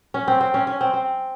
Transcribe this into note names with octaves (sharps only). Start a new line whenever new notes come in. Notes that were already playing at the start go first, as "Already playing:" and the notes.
C#4
C4
C4
C#4
C#4
C4
C4